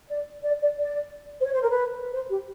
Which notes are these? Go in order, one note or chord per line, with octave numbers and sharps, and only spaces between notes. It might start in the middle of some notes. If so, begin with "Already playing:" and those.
D5
D5
D5
D5
C5
C#5
C5
A#4
B4
C5
G4